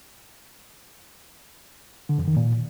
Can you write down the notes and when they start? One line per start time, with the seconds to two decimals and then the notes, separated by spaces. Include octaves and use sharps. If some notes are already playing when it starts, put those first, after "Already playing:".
2.09 D3
2.18 F2
2.28 D#3
2.37 A#2